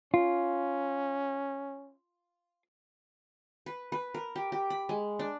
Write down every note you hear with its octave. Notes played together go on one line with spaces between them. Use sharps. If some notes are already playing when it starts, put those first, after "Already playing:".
C#4 F4
B4
B4
A#4
G4
G4
B5
G#3
D4